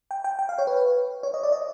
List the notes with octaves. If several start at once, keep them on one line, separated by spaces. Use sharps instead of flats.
G5
G5
G5
F5
C#5
B4
C#5
D#5
D5
D#5